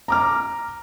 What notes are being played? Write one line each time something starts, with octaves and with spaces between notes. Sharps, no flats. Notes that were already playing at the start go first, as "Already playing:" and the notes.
A#5 D6 F6